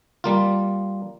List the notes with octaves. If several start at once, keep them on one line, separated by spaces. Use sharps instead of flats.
G3 A#3 F4